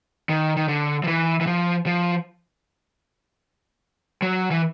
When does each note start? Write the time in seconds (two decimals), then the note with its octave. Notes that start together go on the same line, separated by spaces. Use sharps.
0.29 D#3
0.57 D#3
0.68 D3
1.04 F3
1.08 E3
1.41 E3
1.47 F3
1.86 F3
4.22 F#3
4.51 E3